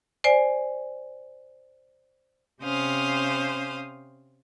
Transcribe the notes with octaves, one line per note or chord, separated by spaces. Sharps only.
C5 D5 G#5
C3 C#4 C5 F5 D#6